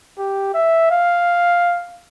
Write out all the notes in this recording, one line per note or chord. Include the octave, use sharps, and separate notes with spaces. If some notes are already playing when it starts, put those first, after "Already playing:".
G4
E5
F5